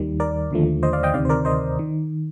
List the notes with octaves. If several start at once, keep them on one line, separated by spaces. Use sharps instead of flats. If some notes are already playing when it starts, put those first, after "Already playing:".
Already playing: D#2 D#3 G3
A#4 D5
D#2 D3 F3 A3
C5 D#5
D5 F5
D#5 G5
D2 C3 D#3 D5 F5
C5
A#4 D5
C5 D#5
D#3